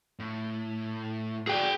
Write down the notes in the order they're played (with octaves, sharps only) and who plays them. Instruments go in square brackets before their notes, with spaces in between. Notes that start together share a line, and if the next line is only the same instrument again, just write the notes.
[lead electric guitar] A2
[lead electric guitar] F#4 D5 [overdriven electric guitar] G#4 G5